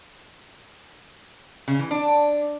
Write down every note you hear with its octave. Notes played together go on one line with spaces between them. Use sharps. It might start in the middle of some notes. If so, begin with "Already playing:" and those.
C#3
E3
D4